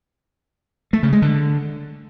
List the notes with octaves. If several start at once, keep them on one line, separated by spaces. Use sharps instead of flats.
A3
C#3
G#3
D3